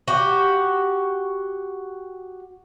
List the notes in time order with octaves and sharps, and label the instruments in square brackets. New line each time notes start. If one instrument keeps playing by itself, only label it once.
[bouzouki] F#4 G4